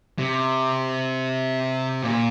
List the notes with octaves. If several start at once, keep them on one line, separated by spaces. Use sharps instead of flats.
C3
A#2